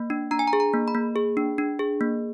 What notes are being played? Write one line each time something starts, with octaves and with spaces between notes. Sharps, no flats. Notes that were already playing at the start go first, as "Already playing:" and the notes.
Already playing: A#3
D4
D4 A#5
G#5
A#5
G#4
A#5
A#3
B5
A#3
G#4
D4
D4
G#4
A#3